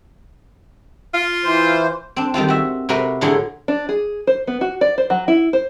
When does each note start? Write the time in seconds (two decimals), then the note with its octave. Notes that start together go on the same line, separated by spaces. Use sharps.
1.14 F4
1.44 E3 C5
2.16 C4 D4
2.34 D#3 G3 C4 F4
2.48 F#4 E5
2.89 C3 F#4 A#4 B4
3.21 A2 D3 F#3 G#4 C6
3.68 D4
3.89 G#4
4.27 C5
4.47 B3
4.61 F#4
4.81 D5
4.98 C5
5.10 F#3
5.28 E4
5.53 C5